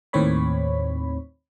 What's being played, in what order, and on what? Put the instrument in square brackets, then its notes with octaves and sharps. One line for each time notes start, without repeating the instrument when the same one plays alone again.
[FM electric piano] D#2 A2 D#3 C4 C#5 B5